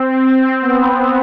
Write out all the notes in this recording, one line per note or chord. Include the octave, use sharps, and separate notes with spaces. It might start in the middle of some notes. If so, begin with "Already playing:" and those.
Already playing: C4
B3